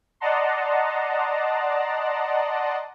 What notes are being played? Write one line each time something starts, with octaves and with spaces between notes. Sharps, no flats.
D5 D#5 F#5 A5 A#5 C6